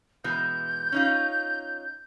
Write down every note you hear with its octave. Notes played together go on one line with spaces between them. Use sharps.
B2 E3 G#3 G6
C#4 D#4 F4